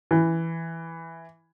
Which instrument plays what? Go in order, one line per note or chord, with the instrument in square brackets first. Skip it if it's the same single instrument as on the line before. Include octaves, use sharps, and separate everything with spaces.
[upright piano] E3